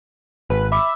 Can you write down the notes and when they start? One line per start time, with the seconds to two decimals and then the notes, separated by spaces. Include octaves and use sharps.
0.50 G#1 B4
0.72 E5 B5 D6